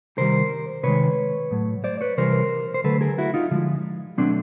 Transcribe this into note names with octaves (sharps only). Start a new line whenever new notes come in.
C3 D#3 G3 A#4 C5
C3 D#3 G#3 B4 C#5
A2 F#3 A3
C5 D5
B4 C#5
C3 E3 G3 A#4 C5
C5
D3 F#3 A3 A4 B4
G#4 A#4
E4 F#4
D#4 F4
D3 F3 G#3
B2 F#3 A3 C4 D4